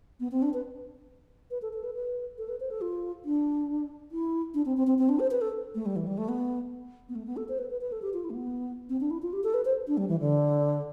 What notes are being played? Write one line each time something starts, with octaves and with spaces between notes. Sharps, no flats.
B3
C4
D4
B4
B4
A4
A4
B4
B4
A4
B4
C5
A4
F4
D4
E4
D4
C4
C4
C4
C4
D4
C5
B4
A4
A3
G3
E3
G3
A3
B3
B3
A3
B3
A4
C5
B4
B4
B4
A4
G4
F4
E4
A3
B3
C4
D4
E4
F4
G4
A4
B4
C5
D4
G3
E3
D3